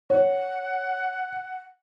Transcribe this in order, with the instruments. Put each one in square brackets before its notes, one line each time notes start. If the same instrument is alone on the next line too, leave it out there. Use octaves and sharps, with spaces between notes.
[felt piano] C#5 [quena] F#5